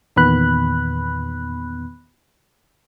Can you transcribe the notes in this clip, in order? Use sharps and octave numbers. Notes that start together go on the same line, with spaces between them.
E2 A#2 D#3 B3 B5 F#6